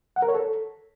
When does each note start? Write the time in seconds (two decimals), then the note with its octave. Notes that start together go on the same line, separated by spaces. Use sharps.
0.16 F#5
0.22 A#4
0.28 C#5
0.35 A4